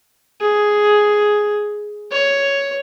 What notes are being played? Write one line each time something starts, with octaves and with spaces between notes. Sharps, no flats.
G#4
C#5